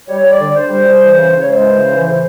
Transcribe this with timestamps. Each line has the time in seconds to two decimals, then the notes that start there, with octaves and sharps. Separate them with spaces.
0.08 G3 C#5
0.24 G3
0.31 D5
0.39 D3
0.54 D3 C5
0.69 G3
0.85 G3
1.00 E3
1.15 C#3
1.31 C#3
1.40 C#5
1.46 G#3 C5
1.62 E3
1.76 C#3
1.92 E3
2.08 A2